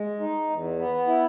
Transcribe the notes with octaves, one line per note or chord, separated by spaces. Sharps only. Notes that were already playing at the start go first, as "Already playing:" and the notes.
Already playing: G#3
D#4
E2
B3
E4